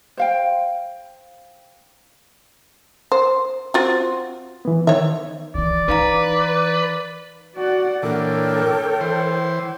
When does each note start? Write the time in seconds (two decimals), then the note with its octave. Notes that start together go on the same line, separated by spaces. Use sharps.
0.17 C5 F5 G5
3.12 C5
3.74 C4 F4 F#4
4.65 E3 B3
4.87 D#3 C#5 E5
5.55 D#3 E3 D5
5.89 E3 D#4 B4 F5 A#5
7.56 F#4 D5 F#5
8.03 A#2 E3 D4 A4 A#4 C#5 G5
9.01 E3 C5